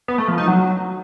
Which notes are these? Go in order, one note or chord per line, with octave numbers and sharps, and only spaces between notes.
B3
A3
F3
D#4
F#3